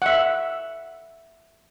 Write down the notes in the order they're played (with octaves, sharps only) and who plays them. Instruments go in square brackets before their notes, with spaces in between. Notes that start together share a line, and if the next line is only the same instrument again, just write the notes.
[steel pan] E5 F#5